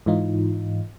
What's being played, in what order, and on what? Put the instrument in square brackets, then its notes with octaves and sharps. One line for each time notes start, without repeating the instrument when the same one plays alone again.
[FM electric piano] G#2 E3 D#4 F4